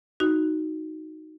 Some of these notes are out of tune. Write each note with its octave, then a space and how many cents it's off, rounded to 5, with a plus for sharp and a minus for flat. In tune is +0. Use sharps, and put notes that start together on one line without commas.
D#4 +0 F#4 +0